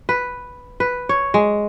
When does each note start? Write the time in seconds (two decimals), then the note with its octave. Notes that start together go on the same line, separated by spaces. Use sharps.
0.09 B4
0.80 B4
1.09 C#5
1.34 G#3